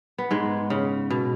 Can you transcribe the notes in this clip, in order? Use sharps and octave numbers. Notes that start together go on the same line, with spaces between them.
B3
G#2 G#3
C#3
B2